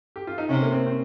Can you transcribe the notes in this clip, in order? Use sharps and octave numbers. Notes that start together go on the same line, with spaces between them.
G4
F4
D#4
C3 C#4
A#3
C4
C4